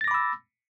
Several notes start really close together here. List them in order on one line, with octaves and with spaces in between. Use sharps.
A6 A#6 D6 B5 E6